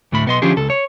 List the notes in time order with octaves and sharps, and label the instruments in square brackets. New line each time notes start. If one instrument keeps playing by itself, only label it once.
[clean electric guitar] D2 A2 B5
B1 B3 D#5 C6
D3 F3 C#4 F4 G4 G#4
C#2 A4
C#5